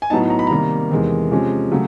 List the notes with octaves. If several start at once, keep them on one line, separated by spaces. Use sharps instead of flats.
G#5
A2 F#3 B3 D#4 A5
A#5
B5
C3 D#3 G3 A#3 A#5
E2 C3 D#3 G#3
C3 F3 G#3 C#4
C#3 F#3 A3